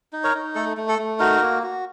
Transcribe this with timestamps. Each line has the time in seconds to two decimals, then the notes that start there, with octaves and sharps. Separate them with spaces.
0.13 D#4
0.24 A#4 C#5
0.35 D#4
0.55 A3 A4
0.77 A3
0.88 A4
0.99 A3
1.19 D#4 F#4 A#4
1.41 A#3
1.63 F#4